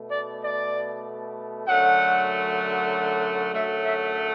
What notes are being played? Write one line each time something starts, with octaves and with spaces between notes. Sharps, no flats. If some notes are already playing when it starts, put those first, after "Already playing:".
Already playing: B2 A3
D5
D5
F#2 D3 F#3 A3 F#5
F#2 D3 F#3 A3 E5
E5